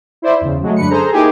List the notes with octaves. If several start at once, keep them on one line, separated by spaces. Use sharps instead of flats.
E4 C5 D5 E5
E2 C#3
F#3 G#3 A3
F#2 D3 B4 C#7
G#4 A4 C5 A#5
A#3 D#4 E4 G4 G#4